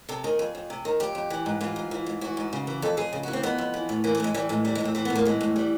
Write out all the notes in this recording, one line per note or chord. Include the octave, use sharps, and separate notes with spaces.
C3 A4
D#3 G#4
F2
F2
C3
D#3
F2 G4
F2
E3
G#2
E3 F4
G#2
E3
G#2
E3 F#4
G#2
C#3
E3
F2 A4
F2 G#4
C#3
F#4
E3
C4
F2 B3
F2
E3
A2
E3 A#3
A3
A2 G#3
E3 G3
A2 G#3
E3 G3
G#3
A2 C4
E3 C4
B3
A2
A#3
E3 G#3
A2
E3 G3